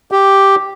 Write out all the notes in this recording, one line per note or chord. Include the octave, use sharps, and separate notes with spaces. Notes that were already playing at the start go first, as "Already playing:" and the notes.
G4